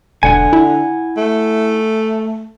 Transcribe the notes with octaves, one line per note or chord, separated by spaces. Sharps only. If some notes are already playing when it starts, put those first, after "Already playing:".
E1 D3 F#5 G#5
E4
A3